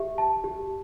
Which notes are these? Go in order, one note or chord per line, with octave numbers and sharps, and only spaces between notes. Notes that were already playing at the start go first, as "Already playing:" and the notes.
Already playing: G4 E5
A5
G4